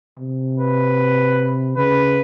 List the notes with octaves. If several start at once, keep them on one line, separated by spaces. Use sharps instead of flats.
C3
B4
C#3 B4